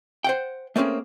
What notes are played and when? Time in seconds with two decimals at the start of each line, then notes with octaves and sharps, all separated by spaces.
0.24 C5 F#5 G5
0.76 A3 A#3 C4 C#4 G#4